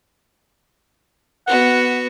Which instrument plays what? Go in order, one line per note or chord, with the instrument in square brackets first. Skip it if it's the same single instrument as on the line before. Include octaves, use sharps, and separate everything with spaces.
[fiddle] B3 F#4 [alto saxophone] F#5